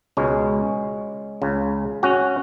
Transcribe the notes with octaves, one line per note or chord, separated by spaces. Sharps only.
C#2 B2 G#3 C#4
C#2 C#3
C#4 F#4